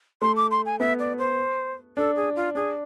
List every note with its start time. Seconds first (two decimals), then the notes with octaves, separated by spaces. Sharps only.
0.22 A3 C6
0.36 D6
0.51 C6
0.66 G#5
0.80 B3 E5
0.99 D5
1.18 C5
1.97 D4 A4
2.16 G#4
2.36 F4
2.55 D4 G#4